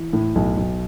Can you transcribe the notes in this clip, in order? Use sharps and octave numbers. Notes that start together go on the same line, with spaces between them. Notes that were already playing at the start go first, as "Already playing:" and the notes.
Already playing: E3
A2
B1
B1